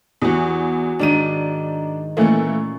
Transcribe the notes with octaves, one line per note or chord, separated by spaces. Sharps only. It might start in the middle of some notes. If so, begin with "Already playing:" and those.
E2 E3 F#4 G4
G#2 D#3 D4 D#7
A#2 E3 A3 A#3 C#4